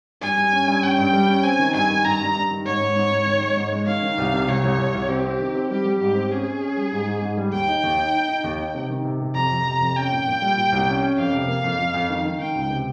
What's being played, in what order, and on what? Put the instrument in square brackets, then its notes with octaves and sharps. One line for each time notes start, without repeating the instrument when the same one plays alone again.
[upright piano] G2 [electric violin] G#5
[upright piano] G2
C#4
G2
[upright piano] C#4 [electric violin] G5
[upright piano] G2
G3
C#4
[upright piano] C4 [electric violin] G#5
[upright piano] D#3
[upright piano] G2 [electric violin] G#5
[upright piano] D#3
[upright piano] G2 [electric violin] A#5
[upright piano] G2
G2
D#3
[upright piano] G#2 [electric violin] C#5
[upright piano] G#2
G#2
G#2
D#3
G#3
G#2
G#3
[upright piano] D#3 [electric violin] F5
[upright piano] D#3
C2
C3
[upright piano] C2 [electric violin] C#5
[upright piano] C2
C2
C2
[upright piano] C4 [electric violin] G4
[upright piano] C4
D#3
C4
[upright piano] G3 [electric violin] G4
[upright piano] G3
[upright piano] G#2 [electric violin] G4
[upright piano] C4
[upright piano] C#4 [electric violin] G#4
[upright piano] C#4
C#4
G3
G#2
G#2
G#2
G3
[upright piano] D#2 [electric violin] G5
[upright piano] D#4
D#2
D#4
D#4
D#4
D#2
D#4
C3
D#3
C3
C3
[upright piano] F2 [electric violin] A#5
[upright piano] F2
C3
F2
[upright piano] C#4 [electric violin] G5
[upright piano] A#2
A#2
G3
A#2
C2
C#4
C#4
[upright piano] F2 [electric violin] F5
[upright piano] C3
A#3
F2
F2
F2
D#3
D#3
[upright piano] D#3 [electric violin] G5
[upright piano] C#2
C3